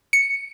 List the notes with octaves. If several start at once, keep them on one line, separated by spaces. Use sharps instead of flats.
C#7